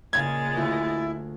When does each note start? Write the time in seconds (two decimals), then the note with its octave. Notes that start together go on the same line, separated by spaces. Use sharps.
0.13 A#2 C#3 G#3 F5 G#6 A6
0.55 D2 E4 F4 G6